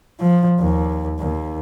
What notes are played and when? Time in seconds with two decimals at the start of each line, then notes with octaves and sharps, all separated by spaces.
0.20 F3
0.60 D#2
1.19 D#2